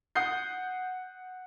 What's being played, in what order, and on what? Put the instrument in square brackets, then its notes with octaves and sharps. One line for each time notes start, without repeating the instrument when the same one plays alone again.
[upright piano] F#5 D#6 G6 C7